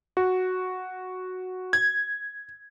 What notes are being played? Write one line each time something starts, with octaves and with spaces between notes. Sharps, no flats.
F#4
G#6